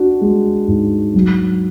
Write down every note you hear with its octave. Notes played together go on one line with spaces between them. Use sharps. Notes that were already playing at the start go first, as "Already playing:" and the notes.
Already playing: D4 F#4
G#3
G#2
F#3